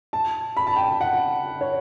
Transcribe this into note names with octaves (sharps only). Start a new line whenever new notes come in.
A5
B5
A5
G5
A5
F#5
C#5